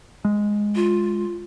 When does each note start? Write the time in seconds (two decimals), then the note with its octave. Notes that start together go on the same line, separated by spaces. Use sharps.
0.25 G#3
0.76 F4